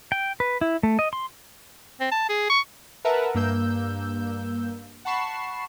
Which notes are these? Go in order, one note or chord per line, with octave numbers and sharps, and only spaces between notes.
G5
B4
E4
A3
D#5
C6
C4
A5
G#4
C#6
A#4 B4 E5 F#5 A5 A#5
G2 A#3 E6 G6
F#5 A5 B5 C#6 C7 E7